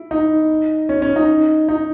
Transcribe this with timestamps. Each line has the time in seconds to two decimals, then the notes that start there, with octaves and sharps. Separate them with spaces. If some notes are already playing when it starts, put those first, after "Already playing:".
Already playing: E4
0.11 D#4
0.89 C#4
1.02 C#4
1.16 D#4
1.69 D#4